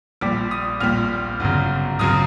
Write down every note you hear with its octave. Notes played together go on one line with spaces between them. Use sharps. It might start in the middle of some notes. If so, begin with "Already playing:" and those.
A#1 A#2 G3 D6
D#6
A#1 A#2 G3 F6
G1 F#2 C#3
G1 F#2 C#3 D#6